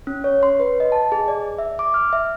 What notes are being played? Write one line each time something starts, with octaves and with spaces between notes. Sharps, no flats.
C#4
C#5
C6
B4
D#5
A5
G#4
D5
E5
D6
F6
E5